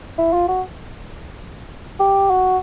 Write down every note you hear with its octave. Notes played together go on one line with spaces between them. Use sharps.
E4
F4
F#4
G4
F#4